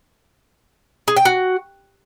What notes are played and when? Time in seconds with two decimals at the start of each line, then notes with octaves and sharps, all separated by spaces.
1.08 G#4
1.16 G5
1.25 F#4